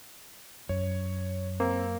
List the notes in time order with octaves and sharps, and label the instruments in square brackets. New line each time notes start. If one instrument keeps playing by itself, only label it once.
[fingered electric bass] F#2 [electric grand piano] C#5
[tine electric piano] A#3 [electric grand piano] C4